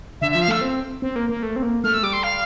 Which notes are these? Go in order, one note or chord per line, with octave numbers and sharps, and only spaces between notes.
D3 E5
E5
F3
F5
A3 E6
C4
C4
A#3
A#3
A3
C4
A#3
A3 F6
E6
G3 D6
C6
F5